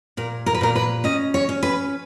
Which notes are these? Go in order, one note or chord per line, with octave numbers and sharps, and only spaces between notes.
A#2 A#4
A#4
B4
A#2 A#4
B4
C#4 D#5
C#5
C#4
B4